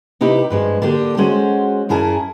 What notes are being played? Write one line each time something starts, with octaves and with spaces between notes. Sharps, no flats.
C3 D#4 E4 G4 B4
G2 F3 G#3
D3 A#3 D4 G4
G#3 C#4 F#4 C5
F#2 E4 G#4 A#4 A5